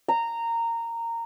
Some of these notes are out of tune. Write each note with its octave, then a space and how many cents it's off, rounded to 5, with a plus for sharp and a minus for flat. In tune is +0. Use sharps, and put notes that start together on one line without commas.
A#5 -15